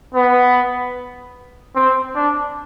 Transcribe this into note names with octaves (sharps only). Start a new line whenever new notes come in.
B3
C4
D4